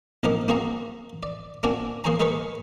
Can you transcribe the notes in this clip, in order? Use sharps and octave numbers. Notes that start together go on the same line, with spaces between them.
A#1 F3 C4 D#4 A#4 D6
A#3 C4 F#4 G#4 F5 A#5
D5
A#3 C4 D4 F#4 D5 G#5
A#3 G#4 C5 C#5 G#5 A#5
G#3 G#4 A#4 B4 C#5 C#6